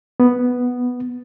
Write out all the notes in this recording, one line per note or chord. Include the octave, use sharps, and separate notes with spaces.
B3